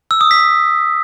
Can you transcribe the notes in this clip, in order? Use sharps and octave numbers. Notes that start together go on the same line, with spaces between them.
E6
D#6
B6